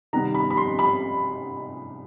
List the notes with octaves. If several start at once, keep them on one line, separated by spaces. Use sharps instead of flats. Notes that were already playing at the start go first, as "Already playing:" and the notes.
C3 D#3 G3 B3 A#5
B5
B5
C6
B5